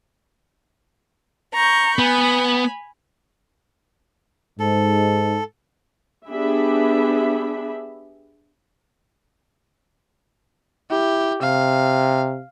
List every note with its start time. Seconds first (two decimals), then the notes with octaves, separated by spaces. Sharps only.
1.53 A#5 C#6 G6
1.99 B3 G#5 B5
4.60 G#2 A4
6.27 B3 D4 G4 G#4 E5 B5
10.91 E4 G4
11.42 C3 F5